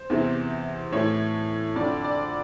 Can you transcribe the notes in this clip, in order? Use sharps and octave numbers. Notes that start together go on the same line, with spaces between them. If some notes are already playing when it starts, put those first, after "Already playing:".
Already playing: C5
E2 C3 E3
A2 E3 C#5
F2 D3 D5
D5